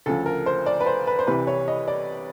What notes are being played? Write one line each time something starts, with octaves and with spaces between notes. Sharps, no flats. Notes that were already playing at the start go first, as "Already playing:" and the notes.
D2 C#3 F3 A4
A#4
C5
D5
B4
C5
B4
C5
C2 C3 E3 G3 B4
C#5
D#5
D5